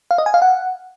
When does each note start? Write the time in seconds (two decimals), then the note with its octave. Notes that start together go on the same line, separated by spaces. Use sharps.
0.11 F5
0.18 D#5
0.26 G#5
0.34 F5
0.42 F#5